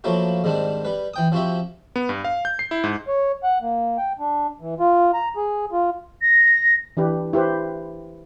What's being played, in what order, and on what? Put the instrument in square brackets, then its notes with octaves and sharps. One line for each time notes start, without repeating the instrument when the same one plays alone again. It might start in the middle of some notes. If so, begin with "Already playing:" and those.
[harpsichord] F3 F#3 A3 A#3 E4 F#4
G#2 D#3 G3 C4 D4
G3 B4
E3 G5 D#6
F3 C4 F#4 G4 E5
[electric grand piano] B3
G2
F5
G6
C7
E4
G#2
[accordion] C#5
F#5
A#3
G5
D4
E3
F4
A#5
G#4
F4
[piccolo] A#6
[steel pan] E3 D4 G4 B4
E4 G4 B4 C5